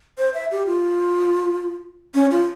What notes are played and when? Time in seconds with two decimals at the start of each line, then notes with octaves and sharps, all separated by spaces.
0.18 C5
0.34 E5
0.51 G4
0.67 F4
2.14 C#4
2.31 F4